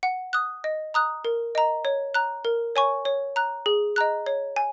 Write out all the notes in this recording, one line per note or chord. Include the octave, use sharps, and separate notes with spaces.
F#5
D#6 F#6
D#5
A#5 D#6 F#6
A#4
D#5 A#5
C#5
A#5 F#6
A#4
C#5 G#5 C#6
C#5
A#5 F#6
G#4
D#5 A#5 F#6
C#5
G#5